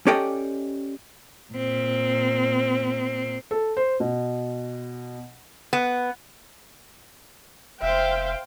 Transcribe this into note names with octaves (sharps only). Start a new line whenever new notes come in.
C#4 G4 A4 D5 D#5 G5
A#2 C4
A4
C5
B2
B3
F1 C5 E5 F5 G5